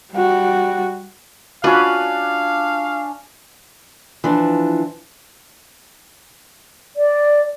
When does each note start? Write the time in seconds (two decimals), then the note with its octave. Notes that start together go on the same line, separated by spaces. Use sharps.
0.13 G3 F#4
1.64 C#4 D4 F4 F#4 B4 F5 F#7
4.24 E3 F3 D4
6.96 D5